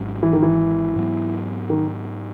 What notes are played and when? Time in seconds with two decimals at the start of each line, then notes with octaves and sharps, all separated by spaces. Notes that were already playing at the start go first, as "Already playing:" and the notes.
Already playing: G#1 G#2 F#3 C#4
0.23 E3
0.33 D#3
0.42 E3
0.96 G#2 F#3 B3
1.70 D#3